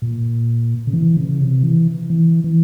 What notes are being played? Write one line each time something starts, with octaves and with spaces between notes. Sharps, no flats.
A#2
C#3
E3
C#3
C3
E3
E3
E3